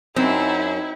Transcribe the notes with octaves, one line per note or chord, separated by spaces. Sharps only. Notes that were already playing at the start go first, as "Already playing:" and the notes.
F#2 C4 D#4 E4